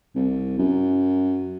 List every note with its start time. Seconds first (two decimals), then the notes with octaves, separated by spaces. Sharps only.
0.15 C2
0.58 F#2